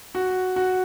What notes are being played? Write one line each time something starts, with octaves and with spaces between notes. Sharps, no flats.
F#4
F#4